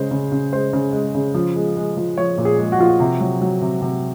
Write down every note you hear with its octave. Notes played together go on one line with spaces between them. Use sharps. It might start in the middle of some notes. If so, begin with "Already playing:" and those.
Already playing: C#3 G#3 C5
C#3
C#3
G#3 C5
C#3
G#3
C#3
F3
G#3
G#3
F3
F3 C#5
A#2
G#4
G#3
F#4
F3 F4
F#4
C3
F#3
F#3
C3
C3